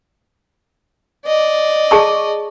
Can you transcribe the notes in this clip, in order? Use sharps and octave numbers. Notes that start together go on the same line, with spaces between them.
D5 D#5
G#4 A5 C#6